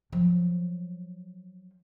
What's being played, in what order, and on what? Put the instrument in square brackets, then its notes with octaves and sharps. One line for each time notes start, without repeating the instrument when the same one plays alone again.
[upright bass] F3 F#3